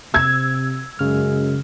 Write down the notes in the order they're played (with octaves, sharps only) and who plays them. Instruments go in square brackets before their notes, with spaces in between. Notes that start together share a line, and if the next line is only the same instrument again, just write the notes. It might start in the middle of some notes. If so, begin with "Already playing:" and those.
[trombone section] C3 [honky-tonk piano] E6 G#6
[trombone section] F#2 G#3 [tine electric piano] C#3 F6